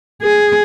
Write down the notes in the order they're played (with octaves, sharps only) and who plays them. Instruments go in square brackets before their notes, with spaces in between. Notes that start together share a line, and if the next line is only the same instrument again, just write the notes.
[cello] G#4